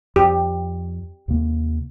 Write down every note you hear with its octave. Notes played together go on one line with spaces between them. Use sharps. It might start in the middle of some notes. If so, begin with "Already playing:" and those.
F2 G4
D#2 C3 A#3